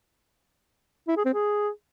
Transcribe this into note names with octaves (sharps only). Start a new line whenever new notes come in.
E4
G#4
C4
G#4